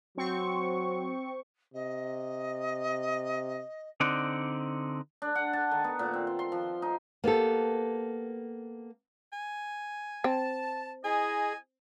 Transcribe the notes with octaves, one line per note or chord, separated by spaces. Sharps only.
F#3 C4 C#6
C3 D#5
D3 C4 D#4 D5 F#5
D4
F#5
A5
D#3
B3
A#2
C4
C6
C6
F3
D#4
A#3 B3 G4 A4
G#5
C4 A5
E4 G#4 D#5 G#5